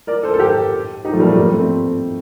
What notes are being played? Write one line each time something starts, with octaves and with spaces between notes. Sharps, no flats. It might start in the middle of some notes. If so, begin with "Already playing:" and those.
A#4 D5
A4 C5
A4
G4 A#4
D#4 G4
F3 A3
G3 A#3
F3 A3
G3 A#3
A3 C4